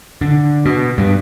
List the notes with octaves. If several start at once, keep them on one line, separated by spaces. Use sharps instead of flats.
D3
B2
G2